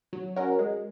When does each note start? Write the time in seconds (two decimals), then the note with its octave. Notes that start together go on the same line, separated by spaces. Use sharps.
0.13 F#3
0.36 C#4 F#4 A#4
0.59 G#3